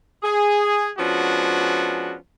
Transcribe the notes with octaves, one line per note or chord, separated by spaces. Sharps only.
G#4
F3 G#3 B3 C#4 D4 F#4